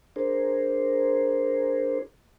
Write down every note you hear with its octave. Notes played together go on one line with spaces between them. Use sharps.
D4 G#4 A#4 C5